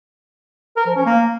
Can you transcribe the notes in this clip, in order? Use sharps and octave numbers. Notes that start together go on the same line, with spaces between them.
A#4
F3
C#4
A#3